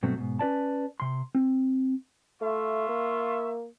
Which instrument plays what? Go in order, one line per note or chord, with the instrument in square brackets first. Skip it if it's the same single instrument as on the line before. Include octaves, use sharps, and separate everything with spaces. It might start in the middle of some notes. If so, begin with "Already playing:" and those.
[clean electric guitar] G2 B2 F#3 A3 C4
G#2 B2
C#4 B4 D5 A5
C3 C6
C4
[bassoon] A3 [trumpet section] F4 E5 C#6
[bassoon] A#3